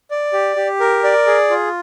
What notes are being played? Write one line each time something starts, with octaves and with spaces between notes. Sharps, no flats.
D5
G4
G4
A#4
D5
G#4
F4